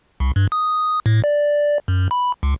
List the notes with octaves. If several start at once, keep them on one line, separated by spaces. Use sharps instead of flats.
C2
G2
D#6
A2
D5
F#2
B5
C#2